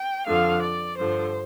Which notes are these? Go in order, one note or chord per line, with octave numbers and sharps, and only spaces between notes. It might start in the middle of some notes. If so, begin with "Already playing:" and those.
Already playing: G5
F2 D3 F3 F5
D5
G2 D3 F3 C5